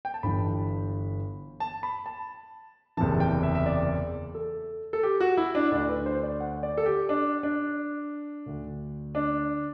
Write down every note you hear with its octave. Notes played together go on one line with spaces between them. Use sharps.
G5
A5
G1 G2 E3 B5
A5
B5
A5
F#1 E2 C3 E3 A5
G5
E5
E5
D5
A4
A4
G4
F#4
E4
D4
D2 D3 D4
B4
C5
D5
F#5
D5
A4
G4
D4
D4
D2 D3
D4